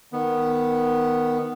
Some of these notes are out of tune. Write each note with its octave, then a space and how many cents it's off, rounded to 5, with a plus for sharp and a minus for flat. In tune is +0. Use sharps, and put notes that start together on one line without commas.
D#3 +0 B3 +0